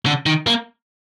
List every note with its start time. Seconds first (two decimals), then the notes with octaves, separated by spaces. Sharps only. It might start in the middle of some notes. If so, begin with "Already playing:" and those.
0.06 D3
0.26 D#3
0.47 A#3